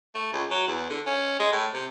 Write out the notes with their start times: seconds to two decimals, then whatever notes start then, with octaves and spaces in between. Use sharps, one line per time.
0.15 A3
0.33 C#2
0.50 F#3
0.67 E2
0.89 D3
1.06 C#4
1.40 G#3
1.52 A2
1.74 C3